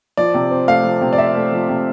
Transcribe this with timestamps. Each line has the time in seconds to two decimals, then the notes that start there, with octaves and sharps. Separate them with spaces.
0.17 F3 D5
0.34 C3
0.51 C4
0.68 A3 F5
0.84 F3
1.01 C3
1.13 D5
1.18 C4 E5
1.35 A3
1.52 F3
1.68 C3